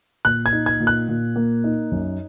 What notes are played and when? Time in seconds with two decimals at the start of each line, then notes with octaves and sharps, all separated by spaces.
0.25 A#2 F#6
0.46 G#6
0.53 D#4
0.66 G#6
0.80 A#2
0.87 F#6
1.08 A#2
1.36 A#3
1.64 D#4
1.92 F#2